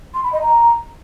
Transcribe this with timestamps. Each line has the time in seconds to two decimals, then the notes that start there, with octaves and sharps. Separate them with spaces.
0.14 C6
0.23 B5
0.33 D#5
0.42 A#5